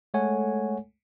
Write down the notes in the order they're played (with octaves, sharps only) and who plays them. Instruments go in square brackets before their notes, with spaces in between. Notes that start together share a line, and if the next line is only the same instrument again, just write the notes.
[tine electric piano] G#3 A3 A4 C#5 F#5 G#5